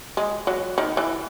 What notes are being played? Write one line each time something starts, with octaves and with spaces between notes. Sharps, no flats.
G#3
F#3
D#3
E3